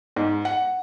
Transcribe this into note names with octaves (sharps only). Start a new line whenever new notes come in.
G#2
F#5